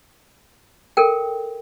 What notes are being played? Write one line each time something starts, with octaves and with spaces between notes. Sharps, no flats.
A4 A#4 G5